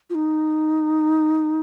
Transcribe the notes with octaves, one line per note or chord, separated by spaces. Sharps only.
F4
D#4